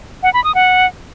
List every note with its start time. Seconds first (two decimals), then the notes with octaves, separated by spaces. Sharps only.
0.23 F#5
0.34 B5
0.44 D#6
0.55 F#5